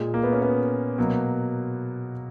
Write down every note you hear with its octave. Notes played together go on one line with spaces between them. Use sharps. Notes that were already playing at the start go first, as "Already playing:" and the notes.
Already playing: A#2 G#3
A#3
B3
C#4
B3
B2 F#3 A#3